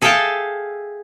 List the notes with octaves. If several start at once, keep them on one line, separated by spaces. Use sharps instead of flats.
G#4 A4 E5 F5 G5 A5